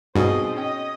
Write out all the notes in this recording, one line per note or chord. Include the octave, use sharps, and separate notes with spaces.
G2 B2 C4 D#4 F#4 G#4 C5 D#5
C#4 D#5 G5